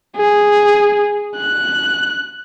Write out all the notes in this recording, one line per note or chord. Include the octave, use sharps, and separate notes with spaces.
G#4
F#6